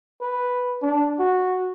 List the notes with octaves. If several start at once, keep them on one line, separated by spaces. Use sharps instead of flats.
B4
D4
F#4